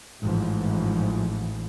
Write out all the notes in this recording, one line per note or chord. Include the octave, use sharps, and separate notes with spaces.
A1 G#2 E3 F3